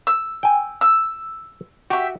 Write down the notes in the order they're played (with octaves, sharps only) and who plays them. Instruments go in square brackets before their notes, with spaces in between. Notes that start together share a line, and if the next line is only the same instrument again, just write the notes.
[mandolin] E6
[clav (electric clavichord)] G5 G#5
[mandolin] E6
[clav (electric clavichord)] F#4 [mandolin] G4 E5